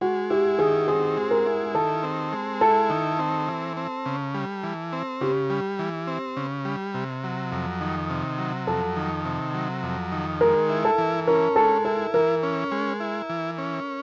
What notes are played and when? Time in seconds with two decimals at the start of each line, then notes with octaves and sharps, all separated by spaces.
0.01 G#3 F#4
0.30 E4 G4
0.59 D#3 G#4
0.88 C4 G#4
1.17 G#3
1.31 A#4
1.46 E4
1.75 D#3 A4
2.03 C4
2.33 G#3
2.61 E4 A4
2.90 D#3
3.19 C4
3.48 E3
3.77 C4
4.06 C#3
4.35 G3
4.63 E3
4.93 C4
5.21 C#3 G4
5.50 G3
5.79 E3
6.07 C4
6.37 C#3
6.65 G3
6.94 C3
7.24 F#3
7.52 F2
7.81 D#3
8.10 C3
8.38 F#3
8.67 F2 A4
8.96 D#3
9.25 C3
9.54 F#3
9.83 F2
10.12 D#3
10.41 G#3 A#4
10.70 E4
10.85 A4
10.98 E3
11.27 C#4 A#4
11.56 G#3 A4
11.85 E4 A4
12.14 E3 A#4
12.43 C#4
12.72 G#3
13.00 E4
13.30 E3
13.58 C#4